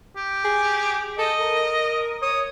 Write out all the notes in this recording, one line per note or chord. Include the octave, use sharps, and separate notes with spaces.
G4
G#4
A4 D#5
A#4
C#5 D#6